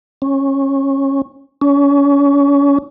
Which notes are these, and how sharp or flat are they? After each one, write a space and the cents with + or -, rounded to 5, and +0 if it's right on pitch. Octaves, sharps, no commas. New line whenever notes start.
C#4 -20
C#4 +30